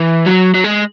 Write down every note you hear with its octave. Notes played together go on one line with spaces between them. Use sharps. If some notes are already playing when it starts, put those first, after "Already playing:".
Already playing: E3
F#3
F#3
G#3